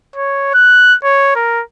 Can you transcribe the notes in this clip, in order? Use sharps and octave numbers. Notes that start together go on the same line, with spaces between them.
C#5
F#6
C#5
A#4